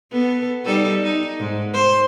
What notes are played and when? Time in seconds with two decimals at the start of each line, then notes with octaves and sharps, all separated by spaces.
0.11 B3 A4
0.65 G3 D#4 A4
1.03 D#4
1.40 G#2
1.73 C5